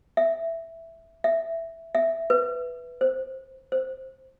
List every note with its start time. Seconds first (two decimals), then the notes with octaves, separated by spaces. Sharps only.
0.17 E5
1.24 E5
1.95 E5
2.30 B4
3.01 C5
3.72 C5